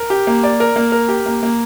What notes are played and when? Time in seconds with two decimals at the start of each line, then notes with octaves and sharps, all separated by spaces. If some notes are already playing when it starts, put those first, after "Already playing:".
Already playing: A#4
0.10 G4
0.27 A#3
0.43 D5
0.60 A#4
0.76 A#3
0.92 A#4
1.08 G4
1.26 A#3
1.43 A#3